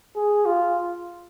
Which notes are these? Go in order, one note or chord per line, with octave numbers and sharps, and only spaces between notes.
G#4
F4